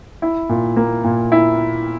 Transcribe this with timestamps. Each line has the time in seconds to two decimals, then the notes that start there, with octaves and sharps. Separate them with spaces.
0.22 E4
0.49 A#2
0.76 A#3
1.04 A#2
1.32 E4